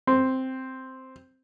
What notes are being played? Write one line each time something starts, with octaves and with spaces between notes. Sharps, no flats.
C4